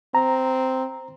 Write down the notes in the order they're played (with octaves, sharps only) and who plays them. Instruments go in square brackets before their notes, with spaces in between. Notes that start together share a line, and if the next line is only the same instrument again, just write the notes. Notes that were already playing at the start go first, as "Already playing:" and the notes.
[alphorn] C4 [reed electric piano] A#5